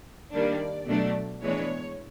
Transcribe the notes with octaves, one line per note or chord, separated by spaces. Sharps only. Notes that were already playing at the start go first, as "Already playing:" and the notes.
D#3 G3 A#3 D4 D5
B2 F#3 A3 D4
A2 E3 G#3 B3 D4 C#5